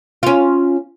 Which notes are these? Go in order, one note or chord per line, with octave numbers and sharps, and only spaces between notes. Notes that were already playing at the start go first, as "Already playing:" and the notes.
C#4 F4